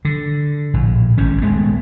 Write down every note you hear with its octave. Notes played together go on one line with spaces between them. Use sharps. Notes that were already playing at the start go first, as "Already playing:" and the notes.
D3
A#1 A2
G#1 G#2 C#4
D#1 G#3 A3 B3